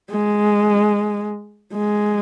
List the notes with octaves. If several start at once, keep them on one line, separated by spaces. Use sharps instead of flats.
G#3
G#3